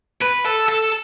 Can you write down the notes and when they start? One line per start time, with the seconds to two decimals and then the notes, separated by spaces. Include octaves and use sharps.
0.22 B4
0.45 A4
0.68 A4